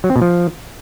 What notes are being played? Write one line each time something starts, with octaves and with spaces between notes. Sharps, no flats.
F#3
C4
B2
F3